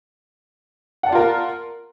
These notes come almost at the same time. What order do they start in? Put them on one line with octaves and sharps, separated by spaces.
F#5 A5 D5 F4 A#4